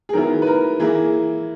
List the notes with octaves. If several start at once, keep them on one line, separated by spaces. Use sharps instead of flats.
G#4
D#3 F#3 B3 E4 A#4
B4
A#4
E3 A#3 E4 G#4